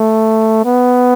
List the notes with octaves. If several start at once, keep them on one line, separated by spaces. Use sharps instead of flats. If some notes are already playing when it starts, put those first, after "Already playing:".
Already playing: A3
B3